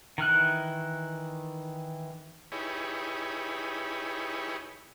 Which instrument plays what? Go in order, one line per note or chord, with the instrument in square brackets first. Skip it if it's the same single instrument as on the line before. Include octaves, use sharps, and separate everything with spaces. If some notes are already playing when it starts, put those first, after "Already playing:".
[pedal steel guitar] D#3 E3 F6 F#6
[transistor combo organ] D#4 E4 G4 G#4 B4 C#5